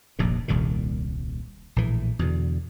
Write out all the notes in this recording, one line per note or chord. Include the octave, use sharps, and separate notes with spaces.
F1 A#1 D#2 A#2
D#1 C2 A#2 D#3
A#1 A2 E3
E2 B2 D3